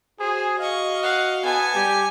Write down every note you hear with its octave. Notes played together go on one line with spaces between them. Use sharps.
F#4 G#4 C5
D#5 F5 C#6
F5 F#5
B3 A4 G#5
G3 G4